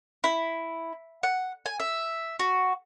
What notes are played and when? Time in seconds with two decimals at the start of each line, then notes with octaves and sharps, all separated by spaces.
0.24 E4
1.23 F#5
1.66 G#5
1.80 E5
2.39 F#4